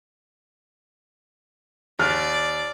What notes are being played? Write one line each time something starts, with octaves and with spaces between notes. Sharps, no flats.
D#2 D5 F6